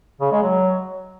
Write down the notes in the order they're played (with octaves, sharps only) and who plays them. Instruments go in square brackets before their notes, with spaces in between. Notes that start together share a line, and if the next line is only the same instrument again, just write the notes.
[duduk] C#3
G#3
F#3